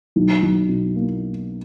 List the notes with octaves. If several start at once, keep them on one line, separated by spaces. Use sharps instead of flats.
B1
B1
B2
A#3